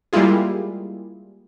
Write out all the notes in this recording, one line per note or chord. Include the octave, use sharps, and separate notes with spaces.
G3 G#3 A#3 E4 F4 G#4